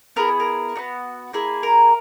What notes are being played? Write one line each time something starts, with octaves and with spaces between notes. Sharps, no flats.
B3 E4 G#4 A#4
A#4
B3 D#4 F#4
A#3 E4 G#4
A#4